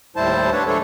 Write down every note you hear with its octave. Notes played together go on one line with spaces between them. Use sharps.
D#2 A2 G3 E4 C5 A5
D4 B4 C#5
F3 G#3 A3 D4 A4 C#5